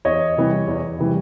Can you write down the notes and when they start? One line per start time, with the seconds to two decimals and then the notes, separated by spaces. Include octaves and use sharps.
0.05 E2 C#5 D#5
0.37 C3 E3 G3
0.67 E2
0.99 C3 E3 G3